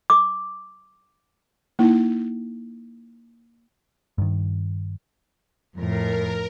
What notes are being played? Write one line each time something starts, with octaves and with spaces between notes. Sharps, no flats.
D6
A#3 D#4 E4
G2 D#3
F2 A2 A#4